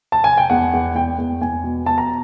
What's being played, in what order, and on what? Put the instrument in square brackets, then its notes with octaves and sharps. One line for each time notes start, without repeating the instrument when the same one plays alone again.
[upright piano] A5
G#5
G5
E2 F#5
E2
E2 G5
E2
E2 G#5
B2
B2 A5
A#5